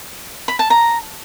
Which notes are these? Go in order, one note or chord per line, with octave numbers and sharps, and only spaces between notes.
B5
A5
A#5